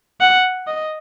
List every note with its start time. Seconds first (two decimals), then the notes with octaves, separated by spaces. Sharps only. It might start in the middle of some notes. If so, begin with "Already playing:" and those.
0.21 F#5
0.67 D#5